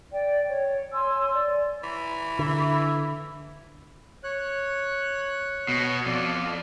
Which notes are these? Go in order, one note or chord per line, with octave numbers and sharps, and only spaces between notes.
D5 G5
C#5
C#5 G#5 C6 E6
D5
E3
D3 E4
C#5 F#6
B2
F2 D5